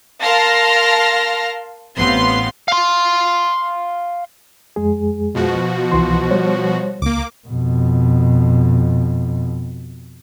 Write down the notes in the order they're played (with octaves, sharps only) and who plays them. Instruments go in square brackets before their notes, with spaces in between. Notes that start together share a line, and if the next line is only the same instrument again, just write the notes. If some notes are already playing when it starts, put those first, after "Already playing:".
[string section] A#4 F5 A5 C6 F6 A#6
A1 B3 C4 F5 C6
[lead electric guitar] F5 C6
[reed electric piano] F2 G#3 G#4
[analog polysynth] B2 F3 F#4
[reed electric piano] C2 E3 C6
G3 C5 C#5
[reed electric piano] C#2 [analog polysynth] A#3 D6
[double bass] F2 B2